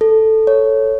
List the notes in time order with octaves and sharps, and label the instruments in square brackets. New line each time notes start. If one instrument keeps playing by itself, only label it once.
[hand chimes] A4
C#5